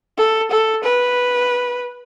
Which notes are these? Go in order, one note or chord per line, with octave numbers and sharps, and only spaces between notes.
A4
A4
B4